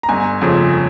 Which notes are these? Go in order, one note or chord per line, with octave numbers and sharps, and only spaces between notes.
A#5
G1 G#5
F2 C#3 F3 C4